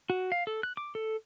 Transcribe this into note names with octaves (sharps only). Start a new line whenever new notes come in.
F#4
F5
A4
F#6
D6
A4